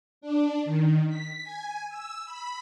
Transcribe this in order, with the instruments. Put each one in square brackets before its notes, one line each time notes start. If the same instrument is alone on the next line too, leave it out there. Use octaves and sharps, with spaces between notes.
[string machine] D4
D#3
B6
G#5
E6
B5